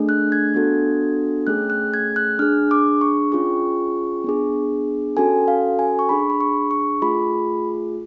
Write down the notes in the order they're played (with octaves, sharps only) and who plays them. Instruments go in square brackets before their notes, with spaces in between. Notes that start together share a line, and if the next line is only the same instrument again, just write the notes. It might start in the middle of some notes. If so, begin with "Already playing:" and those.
Already playing: [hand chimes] A3 D4 G#4
F#6
G#6
B3 D4 F#4 A4
A3 C#4 G#4 F#6
F#6
G#6
F#6
D4 G#4 F6
D6
C#6
C#4 F4 G#4 C#6
B3 D4 G#4
C#4 F#4 A4 G#5
F5
G#5
C#6
D4 G#4 B5
B5
C#6
C#6
A3 F4 G#4 B5